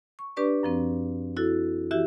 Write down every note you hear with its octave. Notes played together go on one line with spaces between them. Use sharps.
C#6
D4 G4 B4 D5 C#6
F#2 F3 C4
E4 F#4 A4
E3 E4 F#4 G4 E5